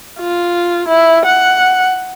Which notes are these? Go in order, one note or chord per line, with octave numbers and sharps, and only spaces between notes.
F4
E4
F#5